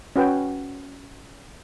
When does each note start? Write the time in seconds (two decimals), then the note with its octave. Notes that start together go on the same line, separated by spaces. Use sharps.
0.16 C#4 F#4 B4 G5